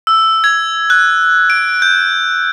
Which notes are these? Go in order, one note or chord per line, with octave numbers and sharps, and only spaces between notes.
E6
G#6
F#6
D7
G6